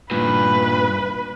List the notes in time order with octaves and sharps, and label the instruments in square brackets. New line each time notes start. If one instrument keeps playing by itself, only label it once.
[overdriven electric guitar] G2 A#2 [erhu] B4